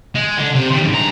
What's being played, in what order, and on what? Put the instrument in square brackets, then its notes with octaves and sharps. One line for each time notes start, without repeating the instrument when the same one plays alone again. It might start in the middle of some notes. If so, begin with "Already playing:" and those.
[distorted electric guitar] G#3
D3
C3
D#3 G3
F2 G#2
G2 A#5